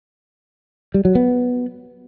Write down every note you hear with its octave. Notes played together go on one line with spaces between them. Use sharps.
G3
F#3
B3